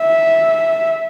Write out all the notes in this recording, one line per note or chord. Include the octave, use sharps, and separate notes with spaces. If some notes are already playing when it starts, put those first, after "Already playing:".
Already playing: E5